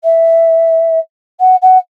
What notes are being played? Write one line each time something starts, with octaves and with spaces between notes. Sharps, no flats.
E5
F#5
F#5